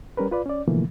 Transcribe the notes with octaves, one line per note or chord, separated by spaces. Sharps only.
G3 C#4 A#4 B4
F4 B4 D5
C#4 D5
B2 D3 E3 F3 A3 A#3